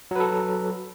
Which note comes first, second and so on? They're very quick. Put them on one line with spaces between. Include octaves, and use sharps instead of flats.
F#3 B4 A4